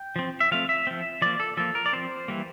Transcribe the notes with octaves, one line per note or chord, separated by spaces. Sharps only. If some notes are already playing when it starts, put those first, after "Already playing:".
Already playing: G5
F3 C4
E5
F3 A3 C4 F5
E5
F3 C4
F3 A#3 D5
A4
F3 A#3 A4
A#4
D5
F3 C4 C5
E3 G3 A#3